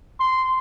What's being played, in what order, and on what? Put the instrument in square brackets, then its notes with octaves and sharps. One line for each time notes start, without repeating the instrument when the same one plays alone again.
[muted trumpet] C6